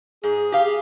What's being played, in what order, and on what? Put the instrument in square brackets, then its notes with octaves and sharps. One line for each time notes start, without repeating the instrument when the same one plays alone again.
[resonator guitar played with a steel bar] G#2 [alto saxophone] G#4
[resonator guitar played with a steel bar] G4 F5
[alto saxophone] G#4